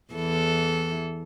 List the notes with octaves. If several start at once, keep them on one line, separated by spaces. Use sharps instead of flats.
E2 E3 A4